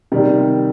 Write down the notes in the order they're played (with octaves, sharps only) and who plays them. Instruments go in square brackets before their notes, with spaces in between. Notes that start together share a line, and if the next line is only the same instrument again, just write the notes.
[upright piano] C3 D#3 G3